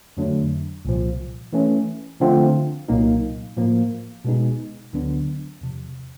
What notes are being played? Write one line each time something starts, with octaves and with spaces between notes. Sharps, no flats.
F2 D3 F#3 A3 D4
C2 A#2 F3
E3 A3 C#4
D3 F3 A3 C4 F4
C2 A#2 F#3 A#3 D#4
A2 F3 A#3
B2 G#3 B3 D#4 G#4
D2 D3 F#3 B3 D4
E2 C3 F3